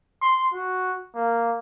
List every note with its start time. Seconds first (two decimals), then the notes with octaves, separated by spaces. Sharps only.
0.22 C6
0.53 F#4
1.16 A#3